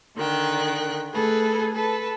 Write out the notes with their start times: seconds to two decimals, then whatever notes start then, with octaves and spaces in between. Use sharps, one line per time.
0.15 D3 D#3 G5 F#6
1.12 A3 G#4 A4 B4
1.73 A4 B4 A5